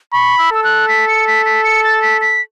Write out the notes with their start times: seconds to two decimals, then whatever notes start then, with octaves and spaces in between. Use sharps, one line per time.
0.12 B5 C#6
0.39 E6
0.52 A4 E6
0.64 F#6
0.88 B6
1.08 C#7
1.27 B6
1.46 B6
1.64 C#7
1.84 A6
2.02 B6
2.21 B6